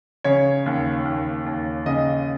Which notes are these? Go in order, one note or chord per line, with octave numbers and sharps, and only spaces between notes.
C#3 C#5
D#2
D#2
D#2
C#3 D#5